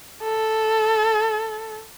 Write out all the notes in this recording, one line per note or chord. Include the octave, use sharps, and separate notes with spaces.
A4